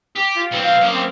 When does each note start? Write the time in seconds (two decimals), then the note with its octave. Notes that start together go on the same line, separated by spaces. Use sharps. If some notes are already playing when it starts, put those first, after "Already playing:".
0.16 G4
0.36 F4
0.51 B1 C4
0.64 F5
0.81 F#2 A#3
0.94 C4